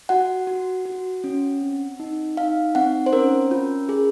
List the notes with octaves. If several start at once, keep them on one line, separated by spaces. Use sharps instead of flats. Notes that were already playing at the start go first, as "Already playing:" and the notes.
F#4 F#5
F#4
F#4
C#4
C4
D#4
D#4 F5
C4 F#5
C5
C#4 A#4
F4
G#4